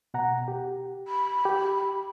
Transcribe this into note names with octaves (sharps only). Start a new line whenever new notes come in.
B2 F#5 A#5
G4
B5
G4